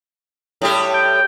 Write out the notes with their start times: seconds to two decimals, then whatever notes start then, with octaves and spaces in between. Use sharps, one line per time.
0.62 A2 G3 G4
0.94 G5